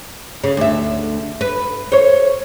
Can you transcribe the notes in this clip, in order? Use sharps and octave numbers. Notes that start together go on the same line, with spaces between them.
C#3
D2 E5
B4
C5 C#5